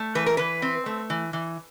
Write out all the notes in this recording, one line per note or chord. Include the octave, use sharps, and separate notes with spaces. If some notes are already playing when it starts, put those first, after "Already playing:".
Already playing: A3
E3 B4
A#4
E3 B4
C4
A3
E3
E3